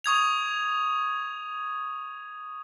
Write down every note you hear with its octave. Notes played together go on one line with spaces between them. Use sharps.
C#6 D#6 G#6 F7